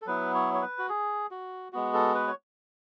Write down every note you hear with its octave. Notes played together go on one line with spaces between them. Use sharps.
A4
F#3 B3 E4 B4
C#5
C#5
B4
F#4
G#4
F#4
G#3 B3 F#4
A4
B4
C#5